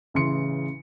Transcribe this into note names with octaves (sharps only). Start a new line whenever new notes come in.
A1 C#3 E3 C6 C#7